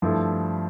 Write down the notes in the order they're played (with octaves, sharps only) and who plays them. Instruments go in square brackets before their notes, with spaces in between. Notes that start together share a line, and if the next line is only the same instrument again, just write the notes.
[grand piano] G2 F3 A3 E4 A4